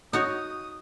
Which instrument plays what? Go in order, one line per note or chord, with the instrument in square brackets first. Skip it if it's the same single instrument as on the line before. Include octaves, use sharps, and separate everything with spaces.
[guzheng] D#4 F#4 C#5 [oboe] D#6